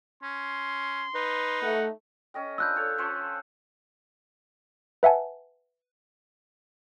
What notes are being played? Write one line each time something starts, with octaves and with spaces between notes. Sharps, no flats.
C#4 C6
D#4 B4
A3 F#5
C#4 D#5 G5
F3 D4 B4 E6 F#6 G6
A4 C#5
F3 C#4 C5
B4 E5 F#5 G#5 A5